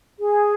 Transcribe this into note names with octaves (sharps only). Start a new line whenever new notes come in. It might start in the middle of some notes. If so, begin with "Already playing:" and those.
G#4